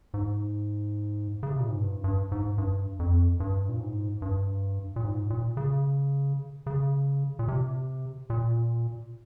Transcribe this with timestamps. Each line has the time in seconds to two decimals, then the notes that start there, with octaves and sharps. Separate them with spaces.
0.14 G#2
1.43 C#3
1.51 C3
1.60 A#2
1.69 G#2
1.77 G2
2.04 G2
2.32 G#2
2.58 G2
2.99 F2
3.40 G2
3.69 A#2
3.80 G#2
4.22 G2
4.96 A#2
5.04 G#2
5.30 A#2
5.57 C#3
6.66 C#3
7.39 A#2
7.48 C3
8.30 A#2